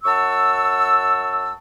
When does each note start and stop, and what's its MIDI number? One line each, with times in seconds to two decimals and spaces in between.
0.04 1.54 42
0.04 1.54 78
0.04 1.54 81
0.04 1.54 85
0.04 1.54 88